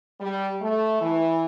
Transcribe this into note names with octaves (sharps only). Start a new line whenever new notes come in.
G3
A3
E3